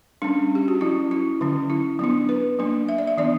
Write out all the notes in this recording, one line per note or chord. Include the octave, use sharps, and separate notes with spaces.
G3 C#4 D4
G4
F#4
F#3 C#4 E4
E4
D3 F#3 C#4
E4
F#3 B3 D4
B4
F#3 A#3 D4
E5
D5
E5
E3 B3 D4 D5